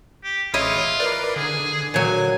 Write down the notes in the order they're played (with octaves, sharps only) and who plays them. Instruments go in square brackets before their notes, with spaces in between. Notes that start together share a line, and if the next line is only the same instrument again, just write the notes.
[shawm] G4
[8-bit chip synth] A1 C#5 D#6 [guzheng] E4 D#5 [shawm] F4
[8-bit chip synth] A#4 B4 D5
[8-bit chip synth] D3 [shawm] G#4
[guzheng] A#2 F#3 [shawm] G#5